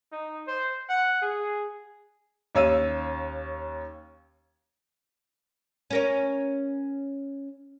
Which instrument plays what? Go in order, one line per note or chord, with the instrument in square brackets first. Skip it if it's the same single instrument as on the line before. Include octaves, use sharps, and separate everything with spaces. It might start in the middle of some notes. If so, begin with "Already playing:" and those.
[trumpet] D#4
C5
F#5
G#4
[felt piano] D#2 C#4 C#5 F5 E6 D#7
[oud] C#4 A#4 C#5